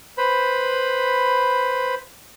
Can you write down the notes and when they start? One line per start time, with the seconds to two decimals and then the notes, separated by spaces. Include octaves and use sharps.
0.18 B4 C5 B5